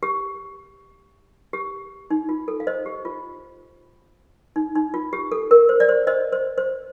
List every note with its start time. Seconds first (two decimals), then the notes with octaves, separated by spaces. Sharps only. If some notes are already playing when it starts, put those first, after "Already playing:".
0.03 G4
1.53 G4
2.10 D#4
2.29 F4
2.48 A4
2.60 F5
2.67 C5 D#5
2.86 G4
3.05 F4
4.56 D#4
4.75 D#4
4.94 F4
5.13 G4
5.32 A4
5.51 A#4
5.69 C5
5.80 D5
5.89 C5
6.07 C5 D#5
6.33 C5
6.58 C5